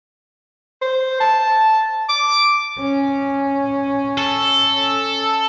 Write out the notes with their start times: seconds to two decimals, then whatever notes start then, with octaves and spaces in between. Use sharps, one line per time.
0.82 C5
1.20 A5
2.09 D6
2.79 C#4
4.18 A4